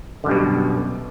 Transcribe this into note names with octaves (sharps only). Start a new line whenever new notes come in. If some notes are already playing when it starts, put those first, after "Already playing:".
F#2 B2 D3 G3